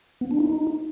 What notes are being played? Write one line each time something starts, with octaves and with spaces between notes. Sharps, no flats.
B3
D4
E4
D#4